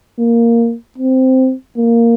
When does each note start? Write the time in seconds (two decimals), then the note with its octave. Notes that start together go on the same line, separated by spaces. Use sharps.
0.19 A#3
0.98 C4
1.77 A#3